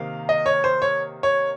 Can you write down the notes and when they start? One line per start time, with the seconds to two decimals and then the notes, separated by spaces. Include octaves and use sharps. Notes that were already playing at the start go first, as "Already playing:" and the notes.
Already playing: C3 D#3 A#3 F5
0.29 D#5
0.46 C#5
0.64 C5
0.82 C#5
1.23 C#5